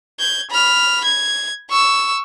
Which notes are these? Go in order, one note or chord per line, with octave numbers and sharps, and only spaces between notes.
G6 G#6
B5 F6
G#6
C#6 E6